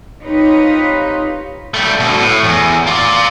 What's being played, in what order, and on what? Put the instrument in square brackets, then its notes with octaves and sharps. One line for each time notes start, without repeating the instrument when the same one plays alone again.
[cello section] C4 D#4 F4 G4 B4 C#5
[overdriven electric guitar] G3 A3
B2 D3
A2
E2
F4 D5